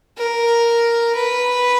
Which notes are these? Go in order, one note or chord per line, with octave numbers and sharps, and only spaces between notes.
A#4
B4